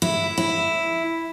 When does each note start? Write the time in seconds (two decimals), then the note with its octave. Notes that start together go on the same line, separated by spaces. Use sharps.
0.02 E4
0.38 E4